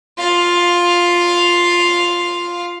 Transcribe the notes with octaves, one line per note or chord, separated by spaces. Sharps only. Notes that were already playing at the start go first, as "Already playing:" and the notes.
F4 F5